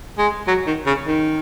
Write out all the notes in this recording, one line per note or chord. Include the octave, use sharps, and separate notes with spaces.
G#3
F#3
D#3
C#3
D#3